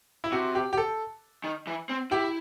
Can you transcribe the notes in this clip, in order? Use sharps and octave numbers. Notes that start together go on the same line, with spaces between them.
E4
C3 F#4
G4
G4
A4
D#3
E3
C4
E4 G4